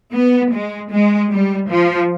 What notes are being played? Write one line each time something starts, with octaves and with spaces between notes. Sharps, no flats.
B3
G#3
G#3
G3
F3